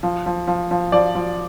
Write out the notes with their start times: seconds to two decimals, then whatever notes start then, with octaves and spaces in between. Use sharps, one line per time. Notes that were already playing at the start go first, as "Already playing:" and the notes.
0.03 F3
0.26 F3
0.47 F3
0.71 F3
0.92 F3 D5
1.15 F3